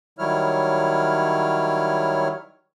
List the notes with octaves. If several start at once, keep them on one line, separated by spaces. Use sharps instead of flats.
D#3 F#3 G3 E4 C#5 F6